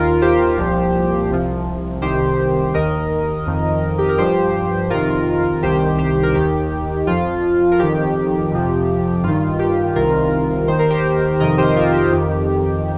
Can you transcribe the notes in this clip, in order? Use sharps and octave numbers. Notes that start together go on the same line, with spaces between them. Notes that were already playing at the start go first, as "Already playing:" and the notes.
Already playing: D#2 D#3 F4 A#4
G4 C5
C2 A#2 F3
C2 C3 F3
C2 C3 D#3 G4 C5
D#2 D#3 A#4 D#5
F2 D#3
G4
A#4
G2 F3 G4 C5
F2 C3 D#3 F4 A#4
C2 C3 D#3 G4 C5
G4 C5
A#4
D#2 D#3 G4
F2 F3 F4
A#4
F2 D#3 G4
F2 C3 F3
G2 D#3 F4
G4
C2 C3 D#3 F4 A#4
D#2 D#3 C5
A#4
G4 C5
F2 C3 D#3 A#4 D#5
G4 C5
F4 A#4
G4
F2 D#3